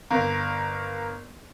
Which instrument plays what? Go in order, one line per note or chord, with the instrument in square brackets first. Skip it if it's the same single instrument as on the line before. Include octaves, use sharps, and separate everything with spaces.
[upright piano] G1 A#4 F5